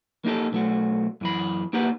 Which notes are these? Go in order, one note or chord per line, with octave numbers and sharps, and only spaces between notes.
A#3 D#4 G4 A4
B1 A3 F#4
F#2 E3 B5
A#3 D#4 G4 B4 F#5